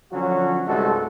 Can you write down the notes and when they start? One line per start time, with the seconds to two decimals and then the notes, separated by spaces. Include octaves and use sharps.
0.11 D3 F3 F#3 C#4 F#4
0.66 C2 G2 G#3 A3 F#4 A4